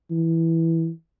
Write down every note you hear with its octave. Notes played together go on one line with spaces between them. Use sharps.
E3